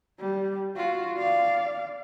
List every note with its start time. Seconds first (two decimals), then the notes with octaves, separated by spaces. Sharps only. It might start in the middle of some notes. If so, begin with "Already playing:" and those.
0.20 G3
0.76 F4 F#4
1.18 D5 F5